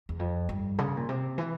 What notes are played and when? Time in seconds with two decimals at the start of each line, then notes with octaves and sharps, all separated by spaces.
0.09 E2
0.19 F2
0.49 G2
0.78 C#3
0.97 A#2
1.09 C3
1.38 E3